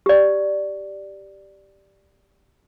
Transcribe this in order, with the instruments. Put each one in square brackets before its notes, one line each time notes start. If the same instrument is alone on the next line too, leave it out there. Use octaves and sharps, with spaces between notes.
[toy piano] G4 D5